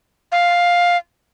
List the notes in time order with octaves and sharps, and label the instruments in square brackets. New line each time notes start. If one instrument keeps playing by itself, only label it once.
[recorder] F5